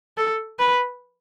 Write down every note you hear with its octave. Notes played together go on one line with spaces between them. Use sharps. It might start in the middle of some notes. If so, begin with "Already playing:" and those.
A4
B4